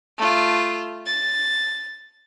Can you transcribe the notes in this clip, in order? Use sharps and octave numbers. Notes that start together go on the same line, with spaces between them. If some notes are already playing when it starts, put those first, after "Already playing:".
A3 F4
A6